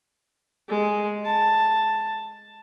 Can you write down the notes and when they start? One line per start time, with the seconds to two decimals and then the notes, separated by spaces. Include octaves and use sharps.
0.68 G#3
1.25 A5